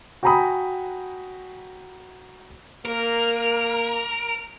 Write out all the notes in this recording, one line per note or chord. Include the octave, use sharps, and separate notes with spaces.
F#4 G5 G#5 A#5 B5 D#6
A#3 A#4